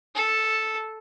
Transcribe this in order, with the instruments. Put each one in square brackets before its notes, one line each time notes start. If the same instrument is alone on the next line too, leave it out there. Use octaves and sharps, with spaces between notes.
[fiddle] A4